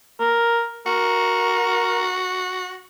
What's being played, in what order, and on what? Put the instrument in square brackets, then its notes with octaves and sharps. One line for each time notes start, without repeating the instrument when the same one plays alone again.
[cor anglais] A#4
[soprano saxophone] F#4 [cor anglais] A#4